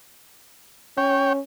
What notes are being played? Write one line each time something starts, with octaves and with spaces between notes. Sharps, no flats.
C#4 C#5 G5